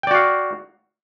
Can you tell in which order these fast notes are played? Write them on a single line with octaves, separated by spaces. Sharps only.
G5 D5 F#4 F5